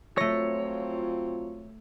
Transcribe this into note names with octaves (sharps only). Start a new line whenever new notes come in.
F#3 A3 C4 F4 C#5 A#6